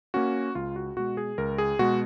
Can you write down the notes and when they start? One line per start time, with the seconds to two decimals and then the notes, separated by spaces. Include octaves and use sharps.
0.14 A#3 C#4 F#4
0.55 C#2 F4
0.76 F#4
0.97 B2 G#3 F#4
1.17 G#4
1.38 C#2 A#4
1.58 G#4
1.79 B2 G#3 F#4